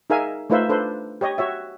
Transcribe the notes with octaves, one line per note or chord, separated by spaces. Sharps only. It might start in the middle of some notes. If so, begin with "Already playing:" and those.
D#4 G#4 A#4 E5 F5 G#5
A3 D#4 F4 B4 C5 E5
D4 A4 B4 C5
G4 C#5 D#5
F#4 C#5 E5